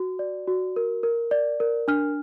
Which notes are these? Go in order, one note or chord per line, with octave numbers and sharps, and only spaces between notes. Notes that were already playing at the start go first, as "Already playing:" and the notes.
Already playing: F#4
D5
F#4
A#4
A#4
D5
A#4
D4 F6